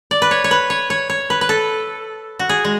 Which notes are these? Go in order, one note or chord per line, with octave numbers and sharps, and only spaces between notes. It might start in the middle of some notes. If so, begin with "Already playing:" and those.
D5
B4
C#5
C#5
B4
C#5
C#5
C#5
B4
B4
A4
F#4
G#4
G#3